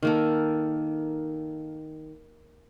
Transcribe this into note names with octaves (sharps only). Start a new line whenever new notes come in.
D#3 A#3 A4